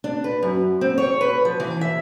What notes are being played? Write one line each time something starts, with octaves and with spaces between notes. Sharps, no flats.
D4
B4
F#2
C4
C#5
B4
F3
E3
E5